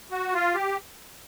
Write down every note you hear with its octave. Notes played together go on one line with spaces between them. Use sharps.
F#4
F4
G4